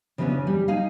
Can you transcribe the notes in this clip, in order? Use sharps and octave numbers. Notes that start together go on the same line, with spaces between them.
C#3 E3 G3 B3 C#4 D4
G3
D#4 G#4 F5